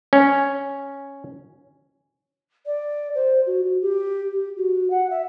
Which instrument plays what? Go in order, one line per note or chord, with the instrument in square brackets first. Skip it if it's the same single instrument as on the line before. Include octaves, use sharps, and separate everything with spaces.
[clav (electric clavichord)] C#4
[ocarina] D5
C5
F#4
F#4
G4
G4
F#4
F#5
E5